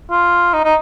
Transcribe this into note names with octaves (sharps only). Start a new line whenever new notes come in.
F4
D#4
D#4